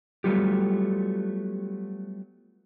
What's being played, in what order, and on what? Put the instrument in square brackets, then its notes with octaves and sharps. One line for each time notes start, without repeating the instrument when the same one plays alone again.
[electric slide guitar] F#3 G3 A3 B3 F4 G4